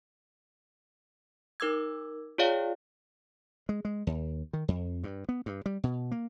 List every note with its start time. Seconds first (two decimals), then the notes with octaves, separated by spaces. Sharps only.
1.60 D#4 A#4 D6 E6 G#6
2.38 F4 G#4 C#5 D5 F5 G5
3.69 G#3
3.85 G#3
4.07 D#2
4.53 D#3
4.68 F2
5.04 G2
5.29 B3
5.46 G2
5.66 G3
5.84 B2
6.12 A#3